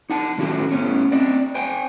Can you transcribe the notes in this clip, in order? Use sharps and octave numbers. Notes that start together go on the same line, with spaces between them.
D#4 F#5 A5
A2 D#3 C#4 F#4 A4
A2 B3 C#4
C4 D5 D#5
C5 G5 G#5